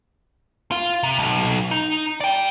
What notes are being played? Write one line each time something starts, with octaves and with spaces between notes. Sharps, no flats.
F4
C3
B1
D#4
D5 G5